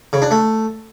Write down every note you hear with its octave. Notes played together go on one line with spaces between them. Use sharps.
C#3
D4
A3